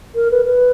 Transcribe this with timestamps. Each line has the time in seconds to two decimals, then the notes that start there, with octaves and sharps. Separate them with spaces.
0.15 A#4
0.31 B4
0.45 B4